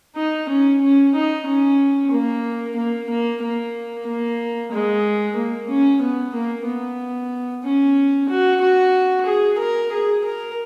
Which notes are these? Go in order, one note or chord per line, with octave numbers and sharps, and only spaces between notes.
D#4
C#4
C#4
D#4
C#4
A#3
A#3
A#3
A#3
A#3
G#3
A#3
C#4
B3
A#3
B3
C#4
F#4
F#4
G#4
A#4
G#4
A#4